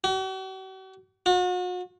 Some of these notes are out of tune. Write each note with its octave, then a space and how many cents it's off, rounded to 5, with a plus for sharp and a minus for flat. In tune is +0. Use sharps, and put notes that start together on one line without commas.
F#4 +45
F#4 -40